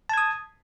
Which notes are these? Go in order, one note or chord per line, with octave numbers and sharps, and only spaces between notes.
A5 D#6 G#6